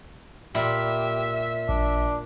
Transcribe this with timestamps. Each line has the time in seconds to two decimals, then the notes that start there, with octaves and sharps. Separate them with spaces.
0.55 A#2 G4 E5 B5
1.69 A1 D4